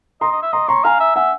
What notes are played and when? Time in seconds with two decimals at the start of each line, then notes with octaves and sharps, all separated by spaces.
0.21 D#5 A#5 C6
0.32 D#5
0.42 E5
0.52 D#5 A#5 C6
0.68 C#5 A#5 C6
0.84 F5 G#5 A#5
1.00 E5
1.15 E5 F#5 G#5